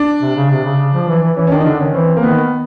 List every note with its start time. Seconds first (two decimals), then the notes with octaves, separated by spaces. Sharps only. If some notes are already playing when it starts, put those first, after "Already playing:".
Already playing: D4
0.22 C3
0.36 C#3
0.51 C3
0.65 C#3
0.79 C#3
0.94 F3
1.08 E3
1.22 E3
1.37 E3 C#4
1.47 C#4
1.51 D#3 D4
1.60 D#4
1.66 D3 D4
1.80 D#3 C#4
1.94 E3 C4
2.17 A#3
2.23 D#3 B3